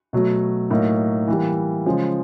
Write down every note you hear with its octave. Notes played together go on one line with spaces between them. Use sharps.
B2 F#3 A3
A2 F#3 A#3 D#4
E3 G3 A#3
C#3 F3 G#3 C#4